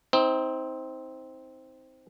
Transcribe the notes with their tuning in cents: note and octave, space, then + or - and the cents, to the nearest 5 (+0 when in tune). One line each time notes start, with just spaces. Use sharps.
C4 +0 D#4 +35